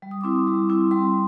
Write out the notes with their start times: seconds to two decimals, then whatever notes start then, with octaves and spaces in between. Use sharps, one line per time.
0.02 G3
0.11 D#6
0.21 C4 E4 D6
0.31 D#6
0.47 G3
0.69 C4 E4
0.91 G3 C6